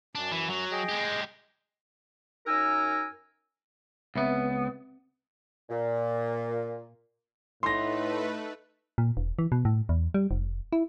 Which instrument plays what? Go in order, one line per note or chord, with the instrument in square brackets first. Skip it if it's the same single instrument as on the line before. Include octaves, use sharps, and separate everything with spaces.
[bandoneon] F#2 [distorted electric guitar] D4
[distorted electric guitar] E3
F#3
[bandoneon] G#4 D#5 G5
[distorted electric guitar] G#3 G4
[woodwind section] F#2 D#4 A#4 G#5 A#5 E6
[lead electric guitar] C#2 B3 [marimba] C4 E5 B5
[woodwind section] A#2
[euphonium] A2 [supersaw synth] A3 B4 [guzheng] B3 D#4 [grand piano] C6 A#6
[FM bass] A#2
E1
E3
B2
A2
E2
G3
F1
E4